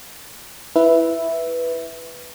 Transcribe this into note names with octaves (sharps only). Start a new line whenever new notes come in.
E4 B4 E5